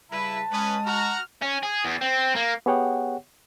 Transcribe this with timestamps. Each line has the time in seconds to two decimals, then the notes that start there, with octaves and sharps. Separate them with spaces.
0.12 C#3 G3 E4 B4 A5
0.51 G#3 C#4 B4 D#6
0.85 F#4 A#5 F6
1.42 C#4
1.63 G#4
1.85 E2
2.01 C4
2.36 A#3
2.66 B3 G4 G#4 C#5 F#5 G5